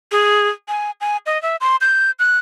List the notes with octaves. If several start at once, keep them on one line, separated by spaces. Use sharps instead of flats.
G#4
G#5
G#5
D#5
E5
C6
G6
F#6